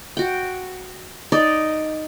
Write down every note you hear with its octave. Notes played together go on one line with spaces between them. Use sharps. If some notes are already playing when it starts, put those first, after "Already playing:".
F#4 G5
D#4 D5 D#5